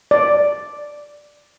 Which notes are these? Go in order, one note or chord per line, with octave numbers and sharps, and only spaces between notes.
D5